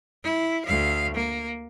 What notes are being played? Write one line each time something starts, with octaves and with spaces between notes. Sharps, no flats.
E4
D2 F5
A#3